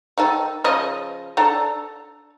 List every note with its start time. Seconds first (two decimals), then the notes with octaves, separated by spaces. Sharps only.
0.18 D#3 D#4 A4
0.64 C#3 F3 D#5
1.37 D4 A4 A#5